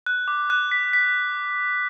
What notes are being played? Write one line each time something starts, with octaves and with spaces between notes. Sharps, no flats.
F#6
D6
F#6
B6
B6